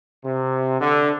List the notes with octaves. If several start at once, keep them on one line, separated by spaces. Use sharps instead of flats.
C3
D3